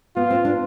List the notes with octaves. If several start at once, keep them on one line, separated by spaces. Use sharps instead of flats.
B3 F4
C4
D4